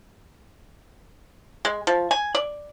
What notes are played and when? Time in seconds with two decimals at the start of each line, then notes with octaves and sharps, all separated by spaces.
1.65 G#3
1.87 F3
2.11 G#5
2.35 D5